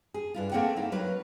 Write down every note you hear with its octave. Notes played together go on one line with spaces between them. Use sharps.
G#4
G2 E4 F4
A3 A#3 C4 G#4 F#5 G5
D#4 E4
F#3 A#4 B4